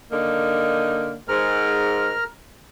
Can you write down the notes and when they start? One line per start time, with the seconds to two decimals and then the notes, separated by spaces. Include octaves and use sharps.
0.12 D3 A#3 D#4
1.28 G#2 A#4 F6